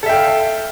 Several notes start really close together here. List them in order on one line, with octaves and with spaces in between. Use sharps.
A4 E5 G5 F5